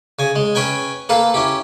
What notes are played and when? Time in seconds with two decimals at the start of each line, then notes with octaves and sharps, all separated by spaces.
0.19 C#3 G#5
0.36 G#3
0.55 C#4 B4 G5 G#5
1.09 A#3 A4 B4 F5
1.34 C#4 E4 G4